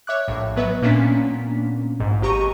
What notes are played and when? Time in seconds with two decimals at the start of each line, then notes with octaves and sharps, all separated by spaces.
0.07 C#5 E5 D6 F#6
0.28 A#1 A2
0.56 F#3 B3 B4 D#5 E5
0.82 A#2 A#3 B3 C#4 D4 B6
2.00 A#1 G#2
2.22 G#1 G4 A#5 C#6 D#7